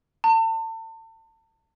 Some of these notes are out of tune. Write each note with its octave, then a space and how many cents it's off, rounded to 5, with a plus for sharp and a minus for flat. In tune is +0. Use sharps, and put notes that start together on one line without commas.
A5 +35